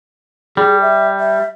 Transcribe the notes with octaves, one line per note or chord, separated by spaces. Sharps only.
G3 G#4
E5
E5